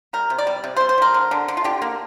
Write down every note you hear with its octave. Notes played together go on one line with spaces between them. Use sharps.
G3 A#4
C3
D5
G3
C3
C5
G3
C5
G3 A#4
D3
D3
D3
F4
D3 G4
A#3